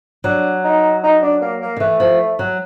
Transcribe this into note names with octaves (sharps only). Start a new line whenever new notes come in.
F#3 D4
D#4
D#4
D4
A#3
A#3
D#3
E3 A3
F3
F#3